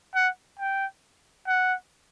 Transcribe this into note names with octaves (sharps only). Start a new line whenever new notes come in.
F#5
G5
F#5